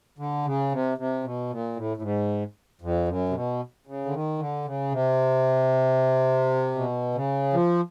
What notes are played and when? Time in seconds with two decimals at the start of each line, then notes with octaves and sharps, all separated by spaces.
0.18 D3
0.45 C#3
0.72 C3
0.98 C3
1.24 B2
1.50 A#2
1.76 A2
1.97 A2
2.02 G#2
2.82 F2
3.08 F#2
3.29 C3
3.34 B2
3.87 C#3
4.05 D3
4.13 D#3
4.38 D3
4.65 C#3
4.92 C3
6.75 B2
7.14 C#3
7.53 F3